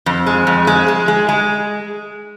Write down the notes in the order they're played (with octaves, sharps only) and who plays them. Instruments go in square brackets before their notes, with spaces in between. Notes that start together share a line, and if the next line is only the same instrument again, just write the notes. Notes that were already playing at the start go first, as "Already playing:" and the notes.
[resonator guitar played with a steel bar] F2
G#3
F2
G#3
G#3
G#3
G#3